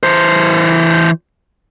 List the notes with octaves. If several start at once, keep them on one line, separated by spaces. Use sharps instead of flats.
E3 C5